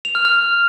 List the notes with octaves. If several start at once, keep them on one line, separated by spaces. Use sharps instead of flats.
F7
F6
F6